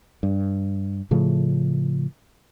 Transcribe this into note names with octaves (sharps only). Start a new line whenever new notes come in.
G2
A2 C#3 F3 A3